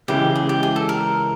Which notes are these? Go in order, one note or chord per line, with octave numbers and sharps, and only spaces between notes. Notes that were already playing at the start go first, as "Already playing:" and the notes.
C#2 C#3 E3 G#3 G4
G#4
G4
G#4
A4
A#4